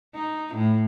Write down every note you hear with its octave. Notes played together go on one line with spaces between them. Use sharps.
D#4
A2